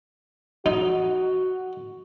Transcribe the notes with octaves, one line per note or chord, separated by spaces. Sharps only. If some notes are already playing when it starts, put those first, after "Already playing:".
D#4 F#4